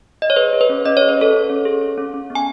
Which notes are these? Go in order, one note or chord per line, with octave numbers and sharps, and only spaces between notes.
D#5
C#5
G#4 B4
G#4
B4
C#4
C#4 D#5
G#4 C#5
B4
G#4 A4 C#5
C#4
C#4
G#4
G#4
C#4
C#4
B3
G#5